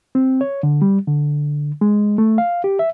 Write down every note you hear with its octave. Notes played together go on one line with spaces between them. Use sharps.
C4
C#5
D3
G3
D3
G#3
A3
F5
G4
E5